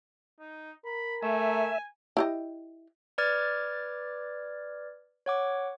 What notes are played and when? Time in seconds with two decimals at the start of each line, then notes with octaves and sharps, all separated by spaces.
0.40 D#4
0.86 A#4 B5
1.23 A3 E5 G#5
2.17 E4 G4 D#5
3.18 B4 D5 D6 F6 G#6 A6
5.26 C#5 F#5 D6